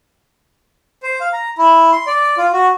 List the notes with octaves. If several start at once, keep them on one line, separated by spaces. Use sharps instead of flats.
C5
F5
A#5
E4
C6
D5
F4
F#4